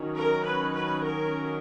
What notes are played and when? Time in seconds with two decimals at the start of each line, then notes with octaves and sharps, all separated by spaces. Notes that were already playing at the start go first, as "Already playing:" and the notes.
Already playing: D#3 F#3 C#4
0.16 A#4
0.46 B4
0.75 B4
1.05 A#4